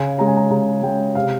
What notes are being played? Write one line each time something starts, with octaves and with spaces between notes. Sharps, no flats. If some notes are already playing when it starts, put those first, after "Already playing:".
Already playing: C#3 G#5
G#3 C#4 A#5
G#5
A#5
C#3 A#5
G#3 C#4 G5
C3 F5